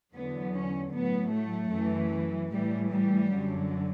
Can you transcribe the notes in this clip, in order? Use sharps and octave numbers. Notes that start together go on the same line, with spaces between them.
E2 D3 F#3 B3
C#4
A2 F#3 B3
A3
F#2 E3
A2 E3 G3
G3
F#2 D3 F#3